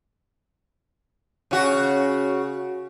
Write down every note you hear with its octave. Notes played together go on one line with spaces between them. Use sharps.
C#3 F#4